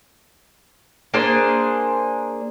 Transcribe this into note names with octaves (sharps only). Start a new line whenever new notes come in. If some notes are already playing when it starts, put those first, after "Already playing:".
A#3 D4 G#4 C5